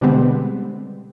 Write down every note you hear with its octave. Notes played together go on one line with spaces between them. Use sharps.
B2 D3 G3 G#3 B3 C4